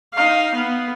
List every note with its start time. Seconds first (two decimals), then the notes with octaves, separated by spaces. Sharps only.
0.14 D#4 F5
0.55 B3